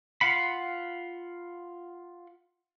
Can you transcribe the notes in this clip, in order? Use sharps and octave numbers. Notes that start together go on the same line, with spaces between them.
F4 F5 F#5 B5